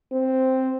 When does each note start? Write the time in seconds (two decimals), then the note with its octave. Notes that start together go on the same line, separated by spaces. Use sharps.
0.12 C4